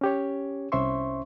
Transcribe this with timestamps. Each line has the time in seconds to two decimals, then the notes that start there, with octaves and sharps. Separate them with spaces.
0.01 C#4 G4 C#5
0.72 C2 C#4 C5 E5 C6 C#6